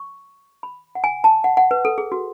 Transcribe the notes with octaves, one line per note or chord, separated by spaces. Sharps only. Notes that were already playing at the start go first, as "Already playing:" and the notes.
Already playing: C#6
B5
F#5
G#5
A5
F#5
F#5
B4
A4
G#4
F#4